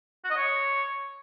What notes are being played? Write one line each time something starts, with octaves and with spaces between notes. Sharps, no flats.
F#4
D#5
C#5